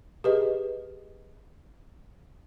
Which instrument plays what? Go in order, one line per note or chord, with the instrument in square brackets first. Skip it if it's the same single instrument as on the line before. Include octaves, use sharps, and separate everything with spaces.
[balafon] G4 G#4 B4 D#5